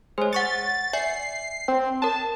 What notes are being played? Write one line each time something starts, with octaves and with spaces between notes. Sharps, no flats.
G#3 C5 C#5
F#5 C#6 A6 C#7
D5 E5 G#5 C7
C4 G5
A#4 C#5 A5